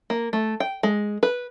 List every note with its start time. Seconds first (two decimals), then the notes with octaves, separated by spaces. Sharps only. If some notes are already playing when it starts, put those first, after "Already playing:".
0.10 A#3
0.33 A3
0.60 G5
0.83 G#3
1.23 B4